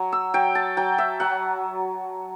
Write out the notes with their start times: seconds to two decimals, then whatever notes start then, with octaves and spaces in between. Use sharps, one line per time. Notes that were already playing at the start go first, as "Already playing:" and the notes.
Already playing: F#3
0.12 E6
0.34 F#3 G5
0.55 A5
0.77 F#3 G5
0.98 E5
1.20 F#3 F#5